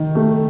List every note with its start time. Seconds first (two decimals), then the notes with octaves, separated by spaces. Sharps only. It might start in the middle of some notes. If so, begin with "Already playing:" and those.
Already playing: D#3
0.15 A3